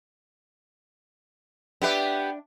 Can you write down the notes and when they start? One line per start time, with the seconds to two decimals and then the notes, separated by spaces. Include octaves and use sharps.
1.82 B3 D4 G4 B4 E5